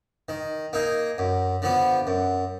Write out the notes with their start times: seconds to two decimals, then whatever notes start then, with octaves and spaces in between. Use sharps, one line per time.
0.29 D#3
0.73 A#3 D#4 G#4
1.18 F#2
1.62 D3 F3 B3
2.07 F#2